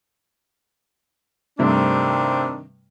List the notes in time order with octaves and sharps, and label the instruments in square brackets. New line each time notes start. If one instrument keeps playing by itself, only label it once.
[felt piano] G2 C3 A3 [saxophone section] D#3 C4 D4